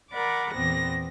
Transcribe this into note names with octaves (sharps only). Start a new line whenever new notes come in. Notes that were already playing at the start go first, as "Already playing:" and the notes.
A#4 D5 F#5 B5 D6
E2 A#2 B3 C4 A#6